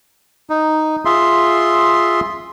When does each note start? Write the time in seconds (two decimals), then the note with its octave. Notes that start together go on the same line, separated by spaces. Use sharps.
0.50 D#4
1.05 F4 G#4 E5 C6